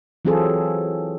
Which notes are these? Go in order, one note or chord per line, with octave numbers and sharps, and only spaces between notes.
E3 F#3 C4 F4 G#4 A4